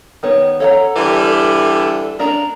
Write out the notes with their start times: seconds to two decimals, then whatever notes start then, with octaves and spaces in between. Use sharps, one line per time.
0.23 D#3 B3 C#5
0.60 A4 C#5 F#5 A#5
0.96 D3 E3 G3
2.19 A#3 D4 A#4 A#5